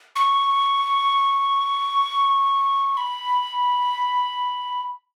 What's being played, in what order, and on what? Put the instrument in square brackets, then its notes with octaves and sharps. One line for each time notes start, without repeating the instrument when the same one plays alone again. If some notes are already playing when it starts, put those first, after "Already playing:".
[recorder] C#6
B5